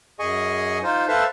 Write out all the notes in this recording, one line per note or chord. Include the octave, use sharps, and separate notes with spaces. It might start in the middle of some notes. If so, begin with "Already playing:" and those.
F#2 G#4 D#5 G#5 C#6
D#4 F4 C5
A4 B4 C5 E5 F5 A5